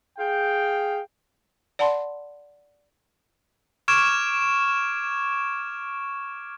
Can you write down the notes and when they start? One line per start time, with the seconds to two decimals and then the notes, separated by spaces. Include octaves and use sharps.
0.17 G#4 F5 G5
1.79 D5 F#5 A5 B5 C6
3.88 C#6 D6 F6 G#6 D7 E7